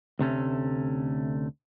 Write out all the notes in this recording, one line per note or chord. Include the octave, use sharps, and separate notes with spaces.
D2 C3 A3 C#4